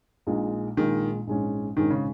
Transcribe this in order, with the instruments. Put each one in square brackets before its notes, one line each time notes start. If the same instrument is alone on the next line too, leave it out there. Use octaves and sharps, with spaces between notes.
[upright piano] A#1 A#2 G#3 D#4
[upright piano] A#1 A#2 G#3 D#4 [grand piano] D#3
[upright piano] A#1 G#2 G#3 C#4
[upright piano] A#1 G#2 G#3 C#4 [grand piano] D#3
[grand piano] C#3